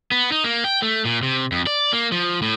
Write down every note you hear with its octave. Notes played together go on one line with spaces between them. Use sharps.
B3
D#4
A#3
G5
A3
A#2
C3
F2
D5
A#3
F3
A2